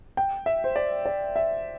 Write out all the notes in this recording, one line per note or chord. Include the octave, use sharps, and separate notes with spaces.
G5
E5
C5
D5
D5
E5